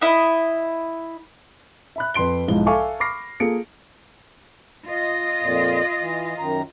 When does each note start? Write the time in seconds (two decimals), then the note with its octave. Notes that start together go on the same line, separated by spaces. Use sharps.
0.01 E4 D#5
1.96 E5 B5 F#6
2.14 F2 B4 C6 D7 G7
2.48 B1 G#2 F3 G#3 E4 G7
2.66 A4 E5 F5 G#5 C#6 D6
3.00 B5 C#6 D6 F6 A#6 C7
3.40 A#3 F4 G#4 A4 C#7 D7
4.86 F4 D#5
5.41 F2 A#2
6.01 E3
6.39 F#2 D#3 A#5